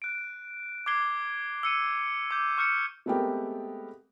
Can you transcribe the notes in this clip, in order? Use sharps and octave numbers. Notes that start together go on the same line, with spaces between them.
F#6 D7
D6 F#6 G#6 C7 G7
E6 C#7 D#7
D6 G6
C#6 F6 G6 C#7
G#3 A3 B3 C4 G4 A#4